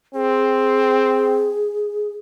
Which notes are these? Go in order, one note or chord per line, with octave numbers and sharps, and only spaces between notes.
C4 G#4